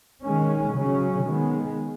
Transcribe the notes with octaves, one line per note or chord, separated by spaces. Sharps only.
D#3 G#3 C#4
C#3 F#3 C#4
D#3 G#3 B3